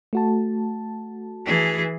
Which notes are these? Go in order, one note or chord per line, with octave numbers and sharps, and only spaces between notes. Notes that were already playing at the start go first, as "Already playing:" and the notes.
A3 F#4 A5
E3 G#4